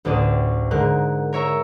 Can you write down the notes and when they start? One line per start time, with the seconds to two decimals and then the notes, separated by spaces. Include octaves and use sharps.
0.05 A1 D2 A2 D5 D#6 E7
0.71 G#2 D3 G#3 A#4 F#6
1.33 A#4 C#5 E5 A#5